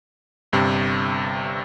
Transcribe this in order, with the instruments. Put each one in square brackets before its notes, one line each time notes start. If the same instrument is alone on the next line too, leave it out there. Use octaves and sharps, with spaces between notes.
[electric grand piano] G1 G2 C3